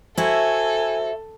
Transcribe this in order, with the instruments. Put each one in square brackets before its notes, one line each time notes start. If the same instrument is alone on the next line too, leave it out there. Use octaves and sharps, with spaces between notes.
[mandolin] A3 E4 [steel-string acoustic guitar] F#4 C5 [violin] A4 [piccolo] G#5